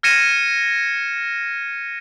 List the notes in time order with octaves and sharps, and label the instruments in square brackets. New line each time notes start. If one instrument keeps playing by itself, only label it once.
[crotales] F6 G#6 A#6 C#7 D#7 E7